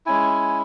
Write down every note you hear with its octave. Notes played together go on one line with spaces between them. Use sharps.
G#3 C#4 E4 G#5
G#5